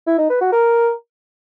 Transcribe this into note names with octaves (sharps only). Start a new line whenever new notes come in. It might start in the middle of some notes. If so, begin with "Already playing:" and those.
E4
D#4
B4
F#4
A#4